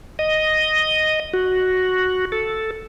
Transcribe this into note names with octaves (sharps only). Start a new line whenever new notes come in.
D#5
F#4
A4